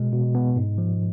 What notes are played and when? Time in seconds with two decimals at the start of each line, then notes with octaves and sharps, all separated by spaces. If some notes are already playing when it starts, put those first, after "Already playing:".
Already playing: B2 G#3 D#5
0.12 B2
0.35 B3
0.56 G#2
0.78 F3